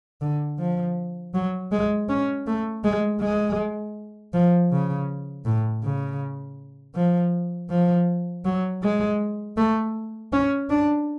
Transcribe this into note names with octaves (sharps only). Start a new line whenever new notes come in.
D3
F3
F#3
G#3
C#4
A3
G#3
G#3
F3
C#3
A2
C#3
F3
F3
F#3
G#3
A3
C#4
D4